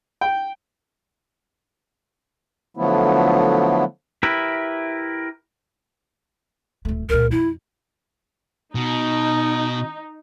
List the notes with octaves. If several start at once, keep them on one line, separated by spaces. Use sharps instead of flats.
G5
D3 F3 F#3 A3 B3 E4
E4 G4 A#4 B4 E5
D1 A3
C#2 A#2 A#4
F2 E4
B2 D#4